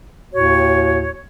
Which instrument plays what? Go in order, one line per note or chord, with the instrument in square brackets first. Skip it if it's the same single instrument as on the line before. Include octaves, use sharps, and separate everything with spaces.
[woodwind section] D#2 A2 F#4 C#5